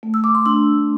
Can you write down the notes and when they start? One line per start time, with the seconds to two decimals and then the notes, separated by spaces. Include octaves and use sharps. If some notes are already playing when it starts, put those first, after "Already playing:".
0.03 A3
0.14 E6
0.24 A3 D6
0.35 C6
0.46 D4 E6